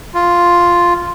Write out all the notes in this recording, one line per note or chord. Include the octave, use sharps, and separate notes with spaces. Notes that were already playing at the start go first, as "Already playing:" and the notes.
F4